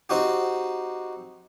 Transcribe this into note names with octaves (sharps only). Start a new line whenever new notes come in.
C4 D#4 F#4 G4